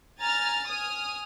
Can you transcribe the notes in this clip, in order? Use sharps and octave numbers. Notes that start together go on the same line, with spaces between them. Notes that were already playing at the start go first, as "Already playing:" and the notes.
G#5 A#5 F6 A6
G#5 D#6 F6